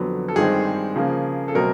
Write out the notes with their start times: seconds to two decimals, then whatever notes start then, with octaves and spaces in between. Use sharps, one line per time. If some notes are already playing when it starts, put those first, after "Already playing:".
Already playing: F2 D3 F#3 B3
0.28 A4
0.36 G2 D#3 G#3 C4 G#4
0.96 C#3 F3 A#3
1.48 A4
1.55 B2 F#3 A3 C4 A#4